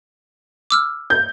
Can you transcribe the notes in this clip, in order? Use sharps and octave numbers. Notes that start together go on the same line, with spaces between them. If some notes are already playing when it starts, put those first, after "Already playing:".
D6 E6 F6
G6